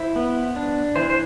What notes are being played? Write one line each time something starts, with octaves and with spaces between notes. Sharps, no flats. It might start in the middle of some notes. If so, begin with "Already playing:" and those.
Already playing: E4 C5
B3
D4
E3 C5
C5